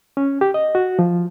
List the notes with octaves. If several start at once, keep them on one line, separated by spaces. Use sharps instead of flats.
C#4
G4
D#5
F#4
F3